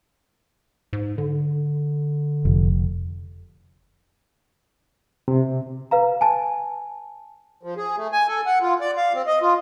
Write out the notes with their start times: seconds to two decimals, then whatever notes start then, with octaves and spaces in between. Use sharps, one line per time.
0.93 G#2
1.18 D3
2.45 F1
5.28 C3
5.91 B4 F5 A#5
6.21 G#5 A5
7.63 F3
7.77 G#4
7.97 A3
8.13 G#5
8.28 A4
8.46 F#5
8.62 F4
8.81 D5
8.97 F5
9.15 C4
9.27 D#5
9.42 F4